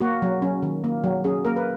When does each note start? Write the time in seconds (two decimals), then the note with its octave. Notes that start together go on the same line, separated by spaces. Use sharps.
0.01 A#3 F#4
0.22 F#3
0.42 C#4
0.62 D#3
0.84 A#3
1.04 F#3
1.24 C#4 G#4
1.45 A#3 A#4
1.56 B4